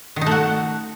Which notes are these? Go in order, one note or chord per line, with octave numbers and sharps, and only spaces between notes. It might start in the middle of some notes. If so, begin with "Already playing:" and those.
D#3
D#4
A3
F#4